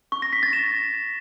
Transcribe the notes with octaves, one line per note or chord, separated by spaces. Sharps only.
C#6
A#6
B6
A6
E7